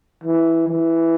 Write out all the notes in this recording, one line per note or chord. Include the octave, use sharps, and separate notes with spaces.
E3
E3